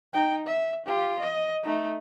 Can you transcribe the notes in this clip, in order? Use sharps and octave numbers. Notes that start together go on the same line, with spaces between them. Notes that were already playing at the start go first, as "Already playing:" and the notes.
D#4 G5
E5
F4 G4
D#5
A3 D#4